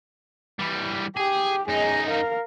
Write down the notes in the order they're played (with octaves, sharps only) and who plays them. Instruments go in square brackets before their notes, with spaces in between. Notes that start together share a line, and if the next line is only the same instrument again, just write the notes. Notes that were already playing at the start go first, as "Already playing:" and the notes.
[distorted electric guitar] E3 G3
[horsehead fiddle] G4 [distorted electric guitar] G#4
[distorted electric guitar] F#2 D#4 [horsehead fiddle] G#4 D#5
[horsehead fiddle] A#4 F5